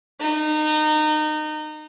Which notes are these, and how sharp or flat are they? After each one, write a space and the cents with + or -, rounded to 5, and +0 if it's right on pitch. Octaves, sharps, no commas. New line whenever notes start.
D#4 -25